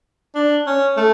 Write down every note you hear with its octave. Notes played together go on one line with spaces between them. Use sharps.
D4
C#4
A3